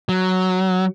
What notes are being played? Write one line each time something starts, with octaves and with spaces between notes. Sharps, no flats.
F#3